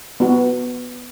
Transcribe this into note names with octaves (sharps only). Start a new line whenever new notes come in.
B3 F#4